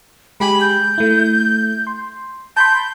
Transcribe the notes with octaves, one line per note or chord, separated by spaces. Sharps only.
G#3 G4 G#5 B5
G6
A3 E4
C6
A5 B5 C6 G6